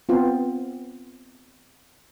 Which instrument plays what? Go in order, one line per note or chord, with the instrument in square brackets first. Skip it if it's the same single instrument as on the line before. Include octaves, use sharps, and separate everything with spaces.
[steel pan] B3 C4 F4